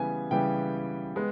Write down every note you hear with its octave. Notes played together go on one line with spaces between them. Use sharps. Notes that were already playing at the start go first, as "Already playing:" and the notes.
Already playing: C#3 E3 G3 B3 G#5
C#3 E3 G3 B3 G5
G#3 B3